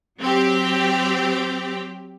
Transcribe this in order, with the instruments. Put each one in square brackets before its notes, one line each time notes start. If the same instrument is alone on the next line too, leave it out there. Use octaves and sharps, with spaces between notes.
[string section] F#3 C4 G4